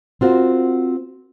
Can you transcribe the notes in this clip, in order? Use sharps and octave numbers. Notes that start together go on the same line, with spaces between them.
C4 F4 F#4 A#4